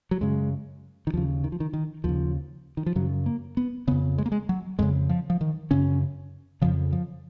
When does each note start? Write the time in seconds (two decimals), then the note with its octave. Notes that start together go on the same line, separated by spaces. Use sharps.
0.11 F#3
0.21 F#2 C#3 G#3
1.07 D#3
1.13 D#2 C#3 F3
1.44 D#3
1.52 F3
1.60 D#3
1.73 D#3
2.04 D#2 C#3 F3
2.77 D#3
2.86 F3
2.95 F#2 C#3 F#3
3.26 A#3
3.57 B3
3.87 F2 C#3 B3
4.18 G#3
4.26 A#3
4.32 G#3
4.49 F#3
4.79 F2 C#3 G#3
5.09 F3
5.30 F3
5.41 D#3
5.71 F#2 C#3 C#4
6.61 F2 C#3 F3
6.93 F3